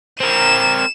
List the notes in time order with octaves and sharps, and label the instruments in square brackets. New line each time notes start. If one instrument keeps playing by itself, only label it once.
[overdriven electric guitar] C4 A#4 [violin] E7